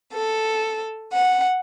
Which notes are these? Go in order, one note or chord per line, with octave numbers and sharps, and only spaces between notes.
A4
F#5